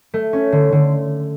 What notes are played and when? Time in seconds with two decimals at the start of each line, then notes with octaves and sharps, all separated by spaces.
0.14 A3
0.33 C#4
0.52 D3
0.72 D3